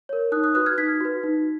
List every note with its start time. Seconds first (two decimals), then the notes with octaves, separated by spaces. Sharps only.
0.09 A#4 C#5
0.32 D#4 D#6 F#6
0.44 D#6 F#6
0.54 F#4 B4 D#6 F#6
0.66 F6 G#6
0.78 D#4 G#6 B6
1.00 F#4 B4
1.23 D#4